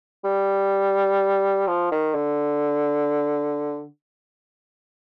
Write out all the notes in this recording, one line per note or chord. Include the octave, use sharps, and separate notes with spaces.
G3
F3
D#3
D3